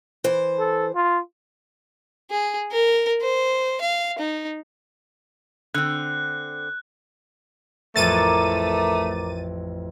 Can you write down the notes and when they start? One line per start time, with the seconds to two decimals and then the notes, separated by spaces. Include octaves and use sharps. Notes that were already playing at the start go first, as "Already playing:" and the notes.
0.24 E3 C5
0.59 A4
0.95 F4
2.31 G#4
2.72 A#4
3.22 C5
3.81 F5
4.19 D#4
5.74 D3 C4 F#6
7.96 A1 F2 A3 A#4 A#5 D6 A6 D#7